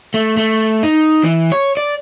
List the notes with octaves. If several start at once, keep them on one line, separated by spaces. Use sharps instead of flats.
A3
A3
D#4
E3
C#5
D5